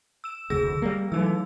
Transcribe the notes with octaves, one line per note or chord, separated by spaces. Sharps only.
E6 E7
F1 D2 G#4 E6 A#6
G3 A#3
E3 F#3 A3 D#4 E6